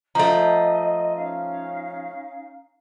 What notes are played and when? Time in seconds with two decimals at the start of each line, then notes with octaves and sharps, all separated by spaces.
0.15 F3 A3 D#5 A#5
1.15 C#4 D#4 F5